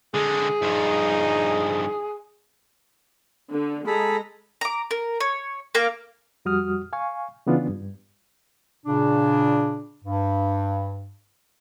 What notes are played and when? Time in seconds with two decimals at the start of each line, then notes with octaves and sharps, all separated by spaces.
0.14 D3 G#3 G#4
0.62 G2 F3 D#4
3.52 D3
3.87 G#3 G#4 A4 A#5 B5
4.61 A#5 D6
4.91 A#4
5.20 C#5
5.75 A#3 F5 A#5
6.45 F2 G3 F#4 D#6 F6
6.93 F5 G#5 C#6
7.47 C#3 E3 B3 D4 F4
7.68 G2
8.86 A#2 C#3 D4
10.05 G2